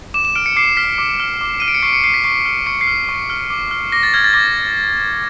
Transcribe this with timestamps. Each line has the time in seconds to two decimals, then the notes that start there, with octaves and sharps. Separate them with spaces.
0.14 D6 E7
0.25 E7
0.35 F6 D7
0.46 C#7
0.56 D6 C7
0.77 F6 B6
0.98 D6
1.20 F6
1.41 D6
1.60 F6 D#7
1.68 D7
1.74 C#7
1.83 C#6 C7
1.88 D7
1.93 C#7
2.04 F6 C7
2.14 B6
2.24 C#6 C7
2.45 F6
2.66 C#6 C#7
2.81 C7
2.87 F6
3.09 C#6
3.30 F6
3.50 D6
3.71 F6
3.92 D6 A#6
4.03 A6
4.14 F6 G#6
4.24 A6
4.33 D6 A#6